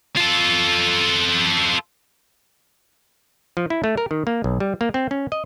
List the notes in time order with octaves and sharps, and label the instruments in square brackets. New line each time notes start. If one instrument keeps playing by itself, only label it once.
[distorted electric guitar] F4 A4
[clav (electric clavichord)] F3
E4
A3
A#4
D#3
A#3
B1
G3
A#3
C4
C#4
D#5